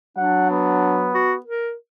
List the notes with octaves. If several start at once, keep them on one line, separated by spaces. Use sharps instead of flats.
F#3 D4 F#5
B3
F#4
A#4